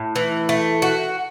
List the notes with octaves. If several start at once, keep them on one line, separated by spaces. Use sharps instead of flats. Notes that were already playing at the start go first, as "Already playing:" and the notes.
Already playing: A2
E3
A3
F#4